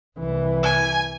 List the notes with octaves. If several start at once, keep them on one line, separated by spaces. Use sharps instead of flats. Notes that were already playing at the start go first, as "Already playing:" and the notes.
C2 E3
G#5